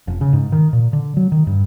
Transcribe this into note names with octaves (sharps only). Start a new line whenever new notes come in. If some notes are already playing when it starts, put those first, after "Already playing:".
F1
C#3
G#2
D#3
A#2
D3
F#3
D#3
G2